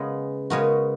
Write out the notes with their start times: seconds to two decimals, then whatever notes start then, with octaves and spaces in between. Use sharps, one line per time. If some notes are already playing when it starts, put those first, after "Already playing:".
Already playing: C#3 G#3 B3
0.50 C#3 G#3 B3 F#4 A#4